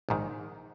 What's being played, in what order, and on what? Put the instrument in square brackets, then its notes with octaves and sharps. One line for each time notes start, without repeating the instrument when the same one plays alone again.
[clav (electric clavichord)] A#1 G#2 D#3